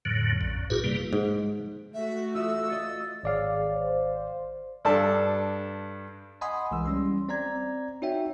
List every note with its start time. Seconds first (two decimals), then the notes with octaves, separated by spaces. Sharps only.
0.05 F2 A2 D3 F#3
0.41 A#1 F#2
0.70 G2 A#2 E4 F#4 G#4 B4
0.84 C3 G3 A#3
1.13 G#2
1.94 A3 F#4 E5
2.35 F4 E5 D#6 E6
2.68 D#5 A6 C#7
3.23 G#1 G#4 C#5 D5 F5
3.76 C5
4.85 G2 D4 A4 A5
6.41 D#5 F#5 G#5 B5 C6 D#6
6.71 C2 E3 G#3 E6
6.86 G3 C#4 C6
7.29 C4 D5 A#5 G#6
8.02 D#4 F#4 C#5 E5 G5